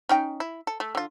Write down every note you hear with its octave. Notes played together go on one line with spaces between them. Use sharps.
C#4 D#4 G5
E4
A4
A3
D3 F4